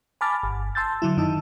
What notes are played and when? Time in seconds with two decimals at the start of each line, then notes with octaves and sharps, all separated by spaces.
0.21 G#5 A5 B5 D6 F6 A6
0.43 G1
0.75 A5 C6 E6 G6 A6
1.02 D3 F#3 E4
1.17 F#2 D#3 D#4 E4 A5 E6